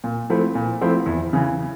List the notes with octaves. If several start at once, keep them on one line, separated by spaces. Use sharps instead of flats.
A#2
F3 A3 C4 E4
A#2
F3 A3 C4 E4
E2
C#3 E3